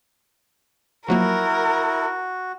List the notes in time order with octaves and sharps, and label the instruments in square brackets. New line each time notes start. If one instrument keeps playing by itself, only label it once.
[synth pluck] F3 F#3 A#3 [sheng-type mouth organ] E4 [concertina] F#4 [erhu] A#4